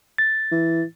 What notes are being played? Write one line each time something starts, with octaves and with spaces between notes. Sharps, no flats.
A6
E3